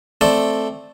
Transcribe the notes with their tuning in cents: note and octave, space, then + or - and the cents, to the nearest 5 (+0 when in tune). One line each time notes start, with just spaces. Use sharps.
A3 +0 C4 +0 D5 +0